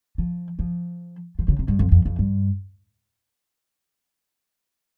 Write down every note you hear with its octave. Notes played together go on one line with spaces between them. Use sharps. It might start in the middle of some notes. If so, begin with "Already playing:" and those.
F3
F3
F3
C#3
C3
G2
F2
F2
F2
G2